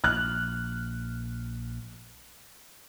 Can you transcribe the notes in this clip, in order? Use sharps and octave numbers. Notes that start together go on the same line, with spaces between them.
A#1 F6 F#6